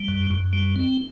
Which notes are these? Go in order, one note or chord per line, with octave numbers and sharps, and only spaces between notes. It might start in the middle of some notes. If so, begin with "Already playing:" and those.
Already playing: G3
F#2
F#2
G3
C4